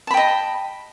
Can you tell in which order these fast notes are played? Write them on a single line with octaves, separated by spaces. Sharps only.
A5 B5 G5 D#5